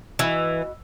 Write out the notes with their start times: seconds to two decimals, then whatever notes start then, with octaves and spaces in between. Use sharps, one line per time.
0.19 E3 F#4 D#5 B5